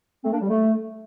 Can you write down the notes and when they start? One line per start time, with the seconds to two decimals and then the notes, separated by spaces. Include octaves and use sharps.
0.24 A3 C4
0.32 A#3 D4
0.41 G3
0.49 A3